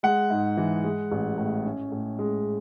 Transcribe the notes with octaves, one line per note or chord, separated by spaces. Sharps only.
G#3 F#5
G#2
E3
G#3
A1
A2
C#4
A2
G#3